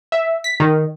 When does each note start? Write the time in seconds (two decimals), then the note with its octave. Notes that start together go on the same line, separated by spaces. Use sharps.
0.12 E5
0.44 B6
0.60 D#3